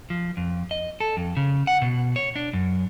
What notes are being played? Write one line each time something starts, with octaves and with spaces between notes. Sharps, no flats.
F3
F2
D#5
A4
F2
C#3
F#5
B2
C#5
D4
F#2